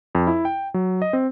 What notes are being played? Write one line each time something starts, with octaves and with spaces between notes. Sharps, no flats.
F2
E4
G5
F#3
D#5
C4